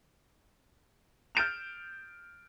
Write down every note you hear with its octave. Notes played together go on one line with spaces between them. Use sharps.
F6 G6 A6 D7 E7 F7